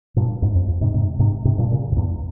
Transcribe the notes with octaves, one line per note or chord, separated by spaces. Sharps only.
G2 A#2
F2 G#2
F2
F2
G#2 C3
G#2 C3
G#2 C3
G#2 C3
G2 A#2
A#2 C#3
F2
E2 G2